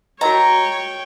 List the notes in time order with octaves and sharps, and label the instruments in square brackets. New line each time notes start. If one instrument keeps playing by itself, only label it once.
[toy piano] F#4 A#4 D#5 [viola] C#5 G5 [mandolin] A#5